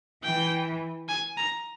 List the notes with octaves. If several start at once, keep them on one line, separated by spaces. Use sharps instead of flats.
E3 G5
G#5
A#5